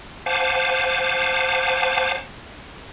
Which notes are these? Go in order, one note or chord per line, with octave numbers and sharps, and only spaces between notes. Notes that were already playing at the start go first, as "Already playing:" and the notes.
C5 F5 F#5 G#5 A5 D6